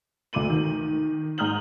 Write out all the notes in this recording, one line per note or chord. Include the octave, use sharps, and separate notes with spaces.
D2 A3 D6 D#7 F#7
D#3
G#2 A#5 D#6 F6 G6 F#7